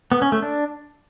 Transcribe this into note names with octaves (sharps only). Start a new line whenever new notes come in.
B3
C#4
A3
D4